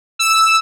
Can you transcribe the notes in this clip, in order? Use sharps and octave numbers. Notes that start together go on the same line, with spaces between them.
E6